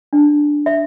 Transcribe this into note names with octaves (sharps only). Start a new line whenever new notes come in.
D4
E5